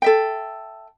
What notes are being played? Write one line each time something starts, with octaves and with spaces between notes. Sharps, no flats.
A4 E5 G5